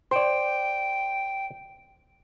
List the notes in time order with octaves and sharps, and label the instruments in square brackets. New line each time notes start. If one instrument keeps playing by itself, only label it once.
[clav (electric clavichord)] C5 D5 [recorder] G5